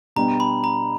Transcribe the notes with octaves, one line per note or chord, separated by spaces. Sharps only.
B2 G3 B3 D4 A#5
B5
A#5